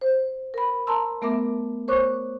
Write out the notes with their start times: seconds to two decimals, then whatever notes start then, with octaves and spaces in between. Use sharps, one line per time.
0.01 C5
0.54 A#4 B5
0.87 A#4 A5 A#5 C6 E6
1.22 A3 B3 A#4 E5 D6
1.88 A#4 C5 C#5 C#6 D6 F#6